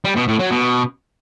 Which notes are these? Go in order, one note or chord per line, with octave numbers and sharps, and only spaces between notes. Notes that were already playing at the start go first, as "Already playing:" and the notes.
G3
B2
A2
F#3
B2